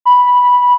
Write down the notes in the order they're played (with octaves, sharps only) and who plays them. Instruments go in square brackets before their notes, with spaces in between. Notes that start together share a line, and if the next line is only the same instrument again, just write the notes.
[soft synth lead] B5